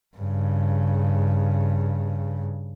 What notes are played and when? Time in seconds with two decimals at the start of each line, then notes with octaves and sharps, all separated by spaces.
0.17 G2 C#3